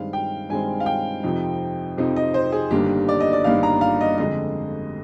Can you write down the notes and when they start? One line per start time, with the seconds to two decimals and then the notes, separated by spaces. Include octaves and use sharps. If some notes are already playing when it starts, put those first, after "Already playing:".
Already playing: G2 D#3 G#3 C4 F5
0.13 G5
0.49 G2 D#3 G#3 C4 G#5
0.80 F5
0.86 G5
1.23 F2 C3 F3 C4 D#4
1.97 F2 C3 F3 C4 D#4
2.16 D#5
2.34 C5
2.52 G#4
2.71 G1 G2 D#3 A#3 D4 G4
3.09 D5
3.20 D#5
3.33 D5
3.44 G1 G2 D#3 A#3 D4 F5
3.63 A#5
3.81 F5
4.01 D#5
4.18 F2 D3 G#3 D#5